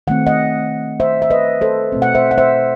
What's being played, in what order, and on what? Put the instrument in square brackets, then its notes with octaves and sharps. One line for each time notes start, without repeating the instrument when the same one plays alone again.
[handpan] D#3 A3 C4 F#5
D#5 F#5
C5 E5
E5
B4 D#5
A4 C5
B2 A3 C4
F#5
C5 E5
F#5
C5 E5